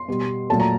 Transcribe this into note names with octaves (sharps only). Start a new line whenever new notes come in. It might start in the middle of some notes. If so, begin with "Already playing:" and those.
Already playing: C6
B2 G3
A#2 F#3 A3 A5
A#5